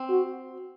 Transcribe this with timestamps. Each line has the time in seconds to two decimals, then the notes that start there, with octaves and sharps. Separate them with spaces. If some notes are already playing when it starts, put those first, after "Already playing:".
Already playing: C4
0.10 F#4